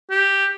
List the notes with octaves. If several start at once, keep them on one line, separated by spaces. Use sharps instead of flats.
G4